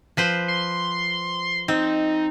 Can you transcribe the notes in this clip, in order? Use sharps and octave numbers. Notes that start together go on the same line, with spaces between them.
F3 B4 C5
C6
C4 D#4